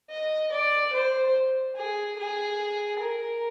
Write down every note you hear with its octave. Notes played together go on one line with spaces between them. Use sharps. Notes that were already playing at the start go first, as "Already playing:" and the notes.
D#5
D5
C5
G#4
G#4
A#4